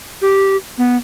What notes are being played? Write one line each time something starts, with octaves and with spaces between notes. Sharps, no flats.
G4
B3